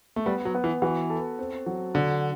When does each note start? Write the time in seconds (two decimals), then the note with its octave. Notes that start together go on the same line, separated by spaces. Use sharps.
0.16 A3
0.26 G3 B3
0.45 F#3
0.55 B3
0.64 E3
0.82 E3 F#4
1.10 A4
1.39 C4
1.66 F#3
1.95 D3 F#4